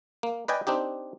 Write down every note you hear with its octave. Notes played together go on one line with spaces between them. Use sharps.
A#3
B4 D5 D#5 G5 G#5
C4 D4 D#4 G4